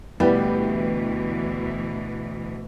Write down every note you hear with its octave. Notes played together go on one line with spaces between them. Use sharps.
D2 B2 E3 G3 B3 E4 G4 B4